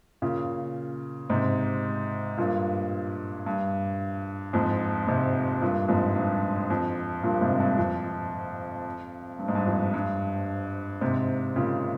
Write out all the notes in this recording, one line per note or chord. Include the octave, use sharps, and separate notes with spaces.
A#2 C#3
G#2 C3
G2 A#2
G2
F2 G#2
G#2 C3
G2 A#2
F2 G#2
G2
F2
G2 A#2
G#2 C3
G2
F2
G2
G#2
G2
F2
G2
G#2 C3
A#2 C#3